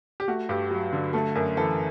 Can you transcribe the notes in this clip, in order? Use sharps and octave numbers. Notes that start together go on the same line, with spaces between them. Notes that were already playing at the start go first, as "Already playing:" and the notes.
G4
A3 F#4
G2 G4
F#3
D3
A3 A4
F#2 A#4
E3 A4